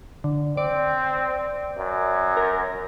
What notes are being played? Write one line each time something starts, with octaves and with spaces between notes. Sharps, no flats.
D3
C4 D5
F#2
A#4